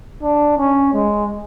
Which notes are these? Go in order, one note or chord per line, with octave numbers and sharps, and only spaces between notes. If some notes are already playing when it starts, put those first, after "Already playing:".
D4
C#4
G#3